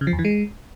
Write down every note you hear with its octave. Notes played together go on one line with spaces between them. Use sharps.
C#3
F3
E2
E3
G#3